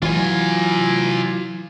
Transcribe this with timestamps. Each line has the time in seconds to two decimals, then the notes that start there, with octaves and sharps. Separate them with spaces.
0.02 E3 F#3 F4 G#5